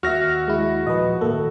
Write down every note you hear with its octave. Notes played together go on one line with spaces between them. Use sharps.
D#2 F#4 E5 F6 A#6
G#3 E4
A#2 F3 B4 D#5
D#1 A2 D#3 A#3 A4